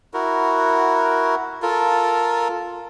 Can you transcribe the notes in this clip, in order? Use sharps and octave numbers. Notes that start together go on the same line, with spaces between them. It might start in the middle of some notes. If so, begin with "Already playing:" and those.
E4 F#4 A#4
F4 A4 A#4